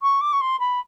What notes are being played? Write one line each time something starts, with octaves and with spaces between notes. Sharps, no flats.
C#6
D6
C#6
C6
B5